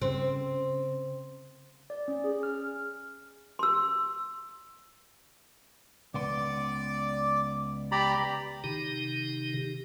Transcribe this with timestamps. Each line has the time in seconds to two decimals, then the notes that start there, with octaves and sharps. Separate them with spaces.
0.02 C#3 C4
1.90 D5
2.08 C#4
2.24 G#4
2.43 F6
3.59 C6 E6
6.14 C#2 B3 D5 C6 D6
7.92 G4 D5 A#5 B5
8.64 C3 D#3 D#4 G4